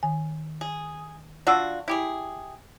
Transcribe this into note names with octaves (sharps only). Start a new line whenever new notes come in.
D#3 G#5
G#4
D4 F4 F#4 D5 F#5 E6
E4 G4 G#4